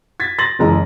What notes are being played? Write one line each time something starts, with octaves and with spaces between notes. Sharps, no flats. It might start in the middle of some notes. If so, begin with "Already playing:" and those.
G#6 A6 B6
C6 A6 A#6 F#7
F#1 E3 G#3 A#5